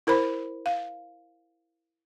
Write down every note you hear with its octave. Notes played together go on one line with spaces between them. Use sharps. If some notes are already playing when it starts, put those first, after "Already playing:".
E4 A#4 C5 B5
F5